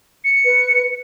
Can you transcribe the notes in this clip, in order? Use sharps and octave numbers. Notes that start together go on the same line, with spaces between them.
C#7
B4